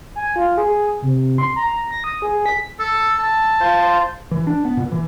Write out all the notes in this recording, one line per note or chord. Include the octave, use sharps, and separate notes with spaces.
G#5
F4
G#4
C3
C6
A#5
A#6
D#6
G#4
B6
A4 E6
A5
F4 C5
E3
D4
B3
A#2
E3